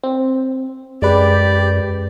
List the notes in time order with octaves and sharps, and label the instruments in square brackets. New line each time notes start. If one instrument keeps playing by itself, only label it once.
[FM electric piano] C4
[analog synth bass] F#2 [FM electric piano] G#3 B4 [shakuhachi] G4 [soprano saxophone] D5